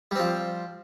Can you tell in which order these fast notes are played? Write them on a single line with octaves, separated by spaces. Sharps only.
G3 C4 F3